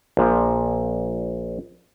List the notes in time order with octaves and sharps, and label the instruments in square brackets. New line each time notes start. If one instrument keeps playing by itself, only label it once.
[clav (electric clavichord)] A#1 A#2 F3